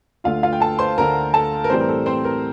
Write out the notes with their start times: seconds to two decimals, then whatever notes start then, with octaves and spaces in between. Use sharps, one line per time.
0.24 D2 D3 A3 F4 F5
0.43 F4 F5
0.53 G5
0.60 A4 A5
0.79 C5 C6
0.97 D2 D3 A3 A#4 A#5
1.34 A4 A5
1.64 A#4
1.70 A2 E3 G3 C4 C5
1.80 A#4
1.89 A4
2.06 C4 C5
2.25 A#4